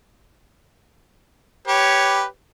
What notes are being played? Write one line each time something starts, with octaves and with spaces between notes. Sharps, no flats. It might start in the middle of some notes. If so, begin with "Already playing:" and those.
G4 B4 C#5